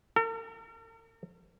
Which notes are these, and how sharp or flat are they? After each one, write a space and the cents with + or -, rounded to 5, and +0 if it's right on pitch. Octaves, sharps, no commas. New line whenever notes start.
A#4 -45